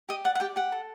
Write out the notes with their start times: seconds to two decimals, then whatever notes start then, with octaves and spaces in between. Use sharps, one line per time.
0.09 G4 D#5
0.25 D5 F#5
0.35 F#5
0.40 G4 D5 G5
0.56 G4 F#5
0.72 A4